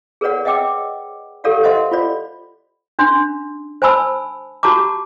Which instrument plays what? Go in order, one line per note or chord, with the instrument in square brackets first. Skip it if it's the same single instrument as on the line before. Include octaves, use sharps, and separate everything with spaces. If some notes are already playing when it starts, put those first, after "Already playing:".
[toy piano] G#4 A#4 B4 C#5 D5 F#5
D#5 E5 F#5 G5 D6 E6
G4 A4 A#4 D5 F5 F#5
A#4 C5 D#5 E5 F#5 C6
F4 C5 D5
C#4 D4 C6
C5 G#5 A5 B5 E6
F#4 G4 A5 A#5 D6